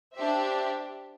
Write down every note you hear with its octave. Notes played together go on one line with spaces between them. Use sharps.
D4 G4 C5 E5